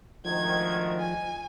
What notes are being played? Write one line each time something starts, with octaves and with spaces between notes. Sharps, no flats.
D2 G#2 D#3 F3 G#6
G#5